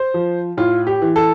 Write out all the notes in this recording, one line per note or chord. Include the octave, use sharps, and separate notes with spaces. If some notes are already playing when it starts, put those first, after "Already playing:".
Already playing: C5
F3
A2 F4
G4
E3
A4